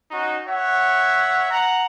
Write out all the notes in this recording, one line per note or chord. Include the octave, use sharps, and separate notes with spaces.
C#4 D#4 F#4
C#5 E5 F#5
F#5 A#5